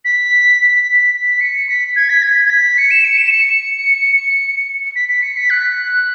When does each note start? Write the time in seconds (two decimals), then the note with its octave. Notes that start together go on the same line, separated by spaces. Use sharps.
0.05 B6
0.60 B6
1.14 B6
1.41 C#7
1.69 B6
1.96 G#6
2.10 B6
2.23 G#6
2.45 G#6
2.50 B6
2.78 C#7
2.91 E7
3.05 C#7
3.18 E7
3.32 C#7
4.95 B6
5.09 B6
5.22 C#7
5.36 B6
5.50 F#6